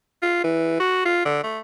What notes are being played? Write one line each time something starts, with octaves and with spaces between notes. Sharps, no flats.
F4
E3
F#4
F4
D3
A3